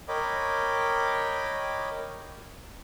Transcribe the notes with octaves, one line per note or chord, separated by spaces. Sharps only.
A#4 C#5 D#5 G5 B5 D6